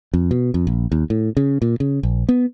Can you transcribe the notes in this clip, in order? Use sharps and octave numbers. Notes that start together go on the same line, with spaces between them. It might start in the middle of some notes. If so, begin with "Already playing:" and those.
F2
B2
F2
A#1
D#2
A2
C#3
A#2
C#3
A#1
B3